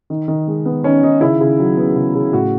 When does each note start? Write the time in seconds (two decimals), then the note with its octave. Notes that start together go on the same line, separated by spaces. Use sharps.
0.10 D#3
0.28 D#3
0.48 G#3
0.65 B3
0.84 D#3 C#4
1.03 D#3 D#4
1.21 C#3 E4
1.40 C#3
1.59 F#3
1.77 B3
1.96 C#3
2.15 C#3
2.33 A2 F#4